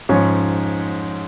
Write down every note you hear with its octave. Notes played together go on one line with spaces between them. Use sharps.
G#2 F3 C#4 C#5